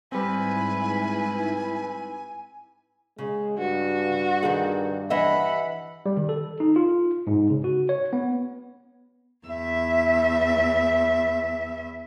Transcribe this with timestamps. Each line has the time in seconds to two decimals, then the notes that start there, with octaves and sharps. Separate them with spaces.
0.12 G#2 G3 C4 E4 B4 G#5
3.18 C#3 G#3
3.58 G2 F#4
4.43 D#3 G#4
5.10 E3 D#5 E5 F#5 B5
6.06 G3
6.17 D#3
6.29 A4
6.60 D#4
6.76 F4
7.27 G#2
7.50 C#3
7.64 F#4
7.89 C#5
8.13 B3
9.46 E2 E5